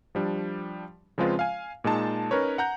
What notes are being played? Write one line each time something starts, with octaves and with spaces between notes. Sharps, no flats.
F3 G3 D4
C#3 F3 G#3 C4 F4 B4
F5 G#5
A#2 G#3 D#4 A5
C#4 D#4 A#4 B4 C#5
F#5 A#5 G6